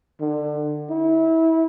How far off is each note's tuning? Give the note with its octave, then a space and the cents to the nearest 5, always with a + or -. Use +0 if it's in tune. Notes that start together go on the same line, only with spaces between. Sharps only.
D3 +25
E4 -25